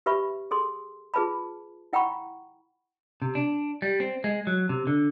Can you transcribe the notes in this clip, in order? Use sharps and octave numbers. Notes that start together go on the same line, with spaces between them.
G4 B4 E5 B5 C#6
G#4 A4 C6
F4 G#4 B4 A5 B5
E4 F#5 G5 A#5 B5 C#6
C3
D4
G3
C4
G#3
F#3
C3
D3